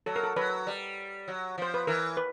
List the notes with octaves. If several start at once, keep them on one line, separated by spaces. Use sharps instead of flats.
F#3 A4
A#4
A4
F#3 B4
G3
F#3
F3 C5
B4
E3 A#4
B4